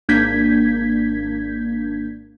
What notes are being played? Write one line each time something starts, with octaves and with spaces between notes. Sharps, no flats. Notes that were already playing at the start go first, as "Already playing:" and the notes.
G#1 A#3 D4 G6 G#6 B6